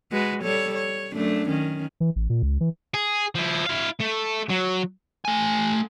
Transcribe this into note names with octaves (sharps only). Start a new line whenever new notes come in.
G#3 F#4 B4
G3 A4 C#5
C#5
F#2 A3 D4
D#3 C#4
E3
A1
A#2
C#2
E3
G#4
F3 E4
E4 F5
A3
F#3
A3 G#5